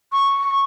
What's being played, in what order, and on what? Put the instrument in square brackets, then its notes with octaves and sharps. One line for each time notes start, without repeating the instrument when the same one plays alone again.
[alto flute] C#6